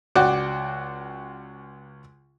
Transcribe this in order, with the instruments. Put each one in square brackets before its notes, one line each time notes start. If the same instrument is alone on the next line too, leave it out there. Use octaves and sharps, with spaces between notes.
[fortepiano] C#2 F#4 D5 F#5 G5